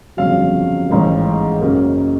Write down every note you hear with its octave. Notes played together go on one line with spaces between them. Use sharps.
G1 F2 C#3 F#3 F5
A1 G#2 D#3 G#3
F#2 C#3 F#3 A#3